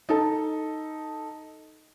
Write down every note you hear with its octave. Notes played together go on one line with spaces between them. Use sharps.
D#4 A4